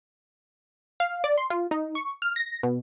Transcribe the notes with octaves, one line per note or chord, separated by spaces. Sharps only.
F5
D5
C6
F4
D#4
C#6
F6
A#6
B2